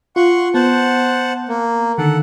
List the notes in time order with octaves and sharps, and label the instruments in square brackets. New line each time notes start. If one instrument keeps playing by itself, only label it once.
[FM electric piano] F4 [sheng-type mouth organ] F#5 C6 C#6
[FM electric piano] B3 [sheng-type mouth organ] C5 F#5 A5
[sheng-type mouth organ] A#3
[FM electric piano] D3 D#3 [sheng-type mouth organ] A4 F#5